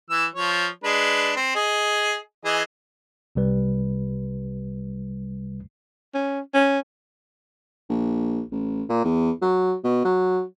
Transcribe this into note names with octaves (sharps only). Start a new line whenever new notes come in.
E3 E6
F3 C#5
G#3 D4 B4
C4
G#4 D#5
E3 G#4 D#5
C2 C3 G3 B4
C#4
C#4
A#1
A1
A#2
E2
F#3
B2
F#3